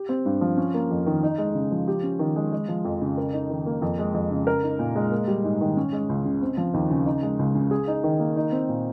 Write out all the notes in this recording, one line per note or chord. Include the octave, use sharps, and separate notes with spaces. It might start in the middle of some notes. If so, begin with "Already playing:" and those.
Already playing: G4
C4
G2
F3
C#4
A#3
F2
D#3
D#4
G#3
C#3
F3
G4
C#4
D#3
G#3
G#3
F3
F2
C#3
A#4
D#4
D#3
A#3
F2
G#3
F2
C#3
A#4
D#4
A#2
G#3
A#3
G3
G#2
D#3
C#4
G#3
C#2
C#3
C4
F3
D#2
C#3
D#4
G#3
C#2
C#3
G#4
D#4
D#3
A#3
D#4
C4
A#2